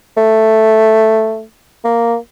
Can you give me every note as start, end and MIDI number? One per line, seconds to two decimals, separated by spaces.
0.17 1.44 57
1.84 2.16 58